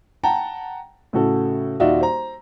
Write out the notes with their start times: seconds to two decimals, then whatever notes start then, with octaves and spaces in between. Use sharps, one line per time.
0.24 F#5 G5 A5 A#5
1.13 A2 C#3 F#4 A4
1.80 D#1 D#4 F4 F#4 D5 E5
2.01 C5 A#5